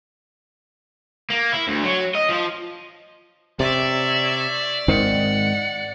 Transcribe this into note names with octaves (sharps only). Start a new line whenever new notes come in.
A#3
E4
D2
F#3
D#5
F3
C3 C#5 D5 E5
G#2 D#3 C4 F#5 C#7